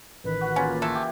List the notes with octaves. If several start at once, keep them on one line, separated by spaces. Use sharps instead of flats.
A1 D#3 B4
F#4
C#3 A#3 C#4 F4
E3 A3 A4
G4